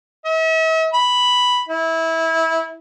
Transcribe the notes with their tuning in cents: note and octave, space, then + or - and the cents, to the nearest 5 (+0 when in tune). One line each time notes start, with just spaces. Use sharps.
E5 -45
B5 +0
E4 -20